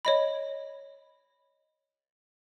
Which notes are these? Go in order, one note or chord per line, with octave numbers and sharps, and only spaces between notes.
C#5 D#5 B5